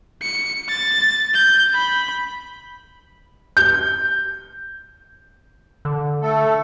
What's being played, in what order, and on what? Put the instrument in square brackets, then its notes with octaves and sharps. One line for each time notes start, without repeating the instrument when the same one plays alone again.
[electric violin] C#7
A6
G6
B5
[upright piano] G6
[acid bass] D3
[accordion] A3 A4